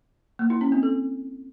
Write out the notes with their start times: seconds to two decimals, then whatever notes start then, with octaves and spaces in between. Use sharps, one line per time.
0.39 A#3
0.50 E4
0.61 C#4
0.72 C4
0.83 A4